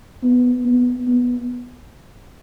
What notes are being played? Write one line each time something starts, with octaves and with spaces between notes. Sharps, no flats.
B3
B3
B3